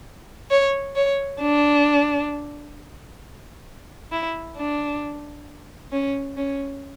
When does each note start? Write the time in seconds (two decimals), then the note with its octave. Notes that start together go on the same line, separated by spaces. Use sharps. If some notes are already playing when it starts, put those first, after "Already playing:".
0.51 C#5
0.96 C#5
1.41 D4
4.12 E4
4.57 D4
5.92 C#4
6.37 C#4